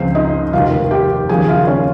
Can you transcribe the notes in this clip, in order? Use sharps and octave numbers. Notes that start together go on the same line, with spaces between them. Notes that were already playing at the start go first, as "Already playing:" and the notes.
Already playing: C#2 C#3 F3 C4 C5
D#4 D#5
F1 D#2 D#3 F4 F5
G4 G5
D#2 C#3 F3 G#4 G#5
F4 F5
C#4 C#5